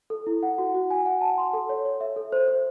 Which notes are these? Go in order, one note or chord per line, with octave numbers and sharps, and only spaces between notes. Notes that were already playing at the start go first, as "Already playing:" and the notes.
A4
E4
F#5
F#4
F#4
G#5
F#5
A5
C6
A4
C#5
C#5
E5
A4
C5
C5